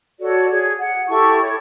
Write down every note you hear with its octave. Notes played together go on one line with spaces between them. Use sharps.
F#4 A4 C#5 D5
G#4 G#6
F#5
E4 G4 A4 C#6
C#5